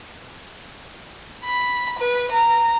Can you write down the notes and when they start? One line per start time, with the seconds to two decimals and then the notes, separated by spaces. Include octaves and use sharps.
1.45 B5
1.99 B4
2.32 A#5